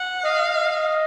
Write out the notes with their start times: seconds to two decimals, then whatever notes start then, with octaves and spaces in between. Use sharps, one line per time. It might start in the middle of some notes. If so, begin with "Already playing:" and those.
Already playing: F#5
0.24 D#5 F5
0.54 D#5